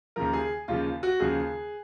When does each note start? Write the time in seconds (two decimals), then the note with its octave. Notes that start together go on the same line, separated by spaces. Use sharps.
0.16 D#2 C#3 F3 A#4
0.33 G#4
0.68 D#2 C#3 F3 F4
1.03 F#4
1.20 D#2 C#3 F3 G#4